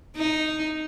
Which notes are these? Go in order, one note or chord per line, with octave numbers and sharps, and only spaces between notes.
D#4